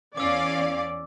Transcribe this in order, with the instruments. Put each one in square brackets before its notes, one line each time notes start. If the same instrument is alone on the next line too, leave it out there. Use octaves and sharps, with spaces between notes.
[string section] E2 C#4 F5 [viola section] D5 [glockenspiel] D6 E6